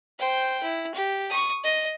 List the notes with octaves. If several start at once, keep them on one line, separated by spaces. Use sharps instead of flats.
C5 G5
E4
G4
C#6 D#6
D#5